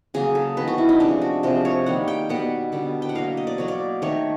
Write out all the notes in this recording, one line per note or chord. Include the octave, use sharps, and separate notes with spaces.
C#3 F#3 A#3 G#4
A4
D#3 F#3 B3 B4
F#4
E4
D#4
C3 F3 G#3 D4
F#4
C3 F3 G#3 B3 C5
C#5
D#3 G3 A#3 F#5
G5
B2 G3 B3 F#5
D3 G3 B3
G5
F#5
B2 F#3 A#3 F5
D#5
D5
B2 F#3 A#3 C#5
D5
D#3 F#3 A3 C#5